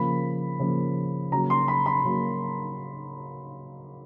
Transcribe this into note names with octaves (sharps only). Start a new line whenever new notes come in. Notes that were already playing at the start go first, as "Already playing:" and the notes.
Already playing: C#3 F3 A#3 B5
C#3 F3 A#3
C#3 F#3 A#3 A#5
C6
B5
B5
C#3 F#3 A#3